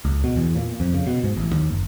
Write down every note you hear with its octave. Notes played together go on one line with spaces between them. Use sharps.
C#2
B2
E2
A#2
F2
C#3
B2
G#2
A1
D#2
F#1